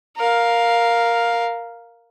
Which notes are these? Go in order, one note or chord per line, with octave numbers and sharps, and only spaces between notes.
A#4 F5